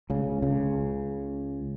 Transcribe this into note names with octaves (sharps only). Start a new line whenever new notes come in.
C#2 C#3
C#2 C#3